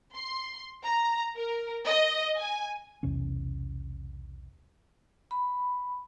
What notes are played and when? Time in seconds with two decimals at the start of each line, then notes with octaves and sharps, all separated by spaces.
0.13 C6
0.84 A#5
1.37 A#4
1.86 D#5
2.37 G#5
3.03 B1 E2 C3 C#4
5.31 B5